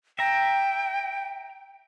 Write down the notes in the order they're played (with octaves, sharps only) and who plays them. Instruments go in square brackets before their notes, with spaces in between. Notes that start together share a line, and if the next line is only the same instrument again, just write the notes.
[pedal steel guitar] E5 A#5 [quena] G5